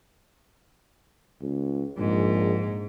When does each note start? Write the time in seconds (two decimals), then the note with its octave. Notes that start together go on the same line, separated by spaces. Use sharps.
1.41 C#2
1.98 A#1 G#2